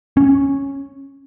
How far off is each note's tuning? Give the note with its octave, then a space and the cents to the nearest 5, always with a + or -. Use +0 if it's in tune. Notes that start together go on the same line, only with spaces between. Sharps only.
C#4 -10